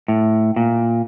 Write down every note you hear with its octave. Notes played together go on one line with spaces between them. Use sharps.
A2
A#2